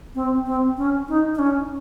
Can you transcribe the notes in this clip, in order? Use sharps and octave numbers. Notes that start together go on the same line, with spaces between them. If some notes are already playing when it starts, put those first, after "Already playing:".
C4
C4
C#4
D#4
D#4
C#4